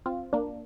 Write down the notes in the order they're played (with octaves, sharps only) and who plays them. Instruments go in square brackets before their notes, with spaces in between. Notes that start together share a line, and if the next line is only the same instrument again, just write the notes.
[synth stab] C4 F4
A#3 D4